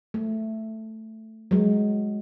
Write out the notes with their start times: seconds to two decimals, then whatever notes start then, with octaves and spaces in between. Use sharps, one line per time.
0.14 A3
1.51 F#3 G#3